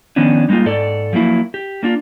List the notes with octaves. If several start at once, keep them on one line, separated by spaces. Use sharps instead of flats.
D#3 F3 B3 C#4 D4
G3 G#3 A#3 D#4 F4
G#2 A4 D5
F3 F#3 A#3 E4
G4
A#3 D4 F4